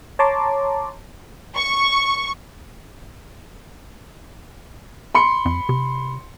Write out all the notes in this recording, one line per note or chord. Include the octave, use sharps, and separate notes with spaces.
C#5 A5 A#5 C6 D6
C#6
B5 C6 C#7
F2
C3